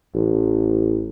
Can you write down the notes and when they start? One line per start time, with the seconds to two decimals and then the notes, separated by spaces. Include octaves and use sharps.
0.14 A1